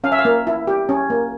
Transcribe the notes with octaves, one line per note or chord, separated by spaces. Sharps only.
C#4 F5
E5
F5
A#3
E4
G4
C#4
A#3